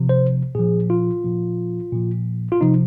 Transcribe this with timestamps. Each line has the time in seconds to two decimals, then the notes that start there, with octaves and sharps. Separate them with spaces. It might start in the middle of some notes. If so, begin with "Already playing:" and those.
Already playing: C3 F3
0.09 C5
0.55 A#2 F3 G#4
0.90 F4
1.24 A#2 F3
1.92 A#2 F3
2.52 F4
2.61 C3 F3 D#4